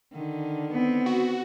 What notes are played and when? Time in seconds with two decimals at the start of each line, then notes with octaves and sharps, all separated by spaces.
0.13 D3 D#3
0.71 B3 C4
1.06 F#4